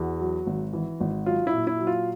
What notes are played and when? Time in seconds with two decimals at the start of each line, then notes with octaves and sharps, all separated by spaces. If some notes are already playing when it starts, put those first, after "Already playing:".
Already playing: E2 F#4
0.20 F#3
0.47 G#1
0.73 E3
1.01 G#1
1.26 F#3 F4
1.47 E4
1.53 A#2
1.67 E4
1.79 F#3
1.87 F4